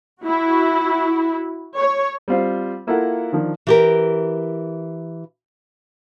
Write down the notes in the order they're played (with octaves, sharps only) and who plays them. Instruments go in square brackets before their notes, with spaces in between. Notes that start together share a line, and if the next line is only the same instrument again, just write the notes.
[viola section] E4 F#4
C#5
[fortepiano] G3 C4 F4 C5
A#3 E4 F4 A4 A#4 F#5
D#3 F3 D4
[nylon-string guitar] E3 G4 A#4